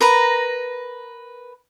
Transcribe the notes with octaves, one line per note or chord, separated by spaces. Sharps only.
A#4 B4 A#5